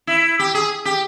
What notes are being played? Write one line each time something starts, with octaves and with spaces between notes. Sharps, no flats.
E4
G4
G#4
G4